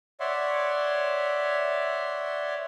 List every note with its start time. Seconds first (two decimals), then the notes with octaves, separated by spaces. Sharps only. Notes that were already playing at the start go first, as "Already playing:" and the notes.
0.20 C#5 D5 E5 F#5 C6